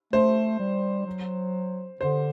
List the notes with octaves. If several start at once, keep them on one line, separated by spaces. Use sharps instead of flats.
A3 C5
G3
F#3
D3 C5